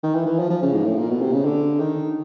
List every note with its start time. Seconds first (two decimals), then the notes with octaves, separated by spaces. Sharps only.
0.03 D#3
0.15 E3
0.26 E3
0.39 F3
0.50 F3
0.62 C#3
0.73 G#2
0.86 A2
0.98 A#2
1.10 B2
1.22 C3
1.33 C#3
1.45 D3
1.80 D#3